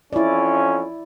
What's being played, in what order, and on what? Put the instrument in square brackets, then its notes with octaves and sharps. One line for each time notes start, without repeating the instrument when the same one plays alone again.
[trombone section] F2 C#4 [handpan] E4 D5